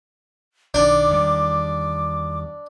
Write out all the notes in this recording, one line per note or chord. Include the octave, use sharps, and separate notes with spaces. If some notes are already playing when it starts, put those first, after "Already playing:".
B1 D#3 D4 D6
E2 D#3 G3